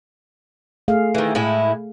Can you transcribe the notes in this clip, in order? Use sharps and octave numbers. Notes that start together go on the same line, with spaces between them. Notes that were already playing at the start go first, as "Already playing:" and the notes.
A3 G#4 F5
D#3 E3
A2 G#3 E4